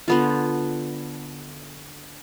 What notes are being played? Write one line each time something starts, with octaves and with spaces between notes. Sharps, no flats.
D3 B3 F4